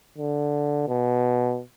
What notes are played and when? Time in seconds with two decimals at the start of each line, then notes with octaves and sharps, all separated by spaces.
0.18 D3
0.88 B2